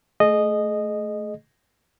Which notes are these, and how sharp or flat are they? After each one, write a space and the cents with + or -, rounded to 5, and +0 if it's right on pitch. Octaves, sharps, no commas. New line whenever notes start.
A3 -5 G#4 +30 D#5 -10